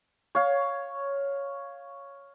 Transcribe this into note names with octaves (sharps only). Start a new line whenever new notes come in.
C#5 F5